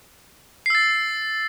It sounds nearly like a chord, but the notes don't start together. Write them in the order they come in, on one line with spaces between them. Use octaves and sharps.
C7 E6 A6